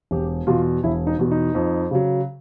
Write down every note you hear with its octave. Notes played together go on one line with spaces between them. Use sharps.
E1 G4
E2 B2 F4
E1 E4
D#4
E2 B2
D#4
F2
C#3 F#3